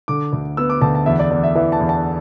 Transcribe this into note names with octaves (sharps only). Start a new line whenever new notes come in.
D3 D6
D2
B3 E6
D6
D2 A5
A5
E2 E5
D5
E2 D5
E5
E3 E5
A5
E2
A5